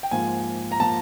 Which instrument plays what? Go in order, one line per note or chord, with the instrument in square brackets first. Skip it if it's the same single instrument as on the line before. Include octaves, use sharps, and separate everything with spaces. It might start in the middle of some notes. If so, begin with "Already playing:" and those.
[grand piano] G5
G#2 F3 A#3 G#5
A#5
F3 A#3 A5